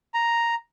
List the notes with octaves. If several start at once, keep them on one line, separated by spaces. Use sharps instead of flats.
A#5